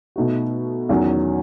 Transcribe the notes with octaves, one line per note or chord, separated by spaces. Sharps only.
B2 A3 D#4 F#4
E2 D#3 F#3 C#4